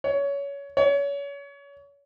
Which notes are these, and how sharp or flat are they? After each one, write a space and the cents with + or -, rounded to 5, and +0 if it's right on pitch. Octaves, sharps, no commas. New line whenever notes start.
C#5 +20
C#5 +30